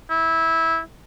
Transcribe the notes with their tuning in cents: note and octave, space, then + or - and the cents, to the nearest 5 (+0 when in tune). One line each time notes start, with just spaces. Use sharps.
E4 -15